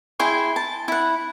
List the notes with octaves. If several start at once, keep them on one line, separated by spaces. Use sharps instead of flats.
E4 G#4 G5 C6
A5
E4 F#5